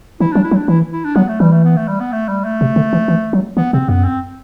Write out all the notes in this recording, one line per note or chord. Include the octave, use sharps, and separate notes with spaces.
E3 E4
F#3 D4
E4
F#3
D4
E3 E4
E4
D4
F#3 B3
A3
E3 G3
A3
B3
A3
G3
B3
A3
G3
A3
C3
D3
E3
E3
F#3
E3 B3
C3 C4
F#2 B3
C4